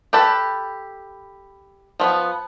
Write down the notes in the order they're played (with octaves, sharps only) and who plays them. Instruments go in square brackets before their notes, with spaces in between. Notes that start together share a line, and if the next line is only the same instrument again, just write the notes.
[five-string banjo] G4 A4 B4 A5
F3 B3